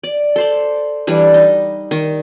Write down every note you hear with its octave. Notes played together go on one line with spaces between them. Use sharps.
D5
A4 C5 D5
E3 G3 D4
D#4
D#3